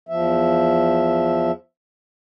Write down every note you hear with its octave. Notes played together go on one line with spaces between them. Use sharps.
E2 F3 E5